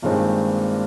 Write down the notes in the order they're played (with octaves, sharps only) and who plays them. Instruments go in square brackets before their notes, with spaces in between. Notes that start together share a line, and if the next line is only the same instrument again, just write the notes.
[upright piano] G2 D#3 G#3 C4 D#4 [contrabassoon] A#2